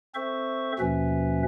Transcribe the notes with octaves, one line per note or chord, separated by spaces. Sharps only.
C4 A4 C5 E5 C#6
D#2 B2 F3 C#4 B4 E5